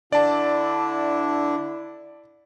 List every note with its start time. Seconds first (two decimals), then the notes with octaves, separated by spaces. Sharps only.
0.12 D3 D4 E4 D5 A5